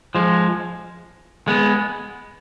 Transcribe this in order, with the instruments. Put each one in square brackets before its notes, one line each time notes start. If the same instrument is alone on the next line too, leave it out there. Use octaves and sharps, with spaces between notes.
[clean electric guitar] F3 G#3
G#3 B3